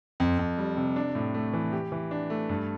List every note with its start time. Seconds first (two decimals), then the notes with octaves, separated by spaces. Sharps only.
0.20 F2
0.39 F2
0.58 G3
0.77 C3
0.96 D4
1.15 A2
1.34 A3
1.53 E3
1.72 G4
1.92 E3
2.11 D4
2.30 A3
2.49 G2